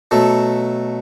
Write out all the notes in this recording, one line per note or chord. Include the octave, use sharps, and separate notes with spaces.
B2 F#3 A3 A4